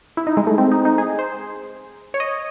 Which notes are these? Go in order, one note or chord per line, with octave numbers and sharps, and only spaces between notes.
E4
D#4
G#3
A3
C4
D#4
D#4
G#4
C5
C#5
D#5